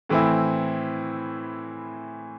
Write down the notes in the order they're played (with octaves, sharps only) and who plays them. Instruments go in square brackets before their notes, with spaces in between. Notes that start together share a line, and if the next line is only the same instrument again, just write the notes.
[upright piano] A2 E3 C4 E4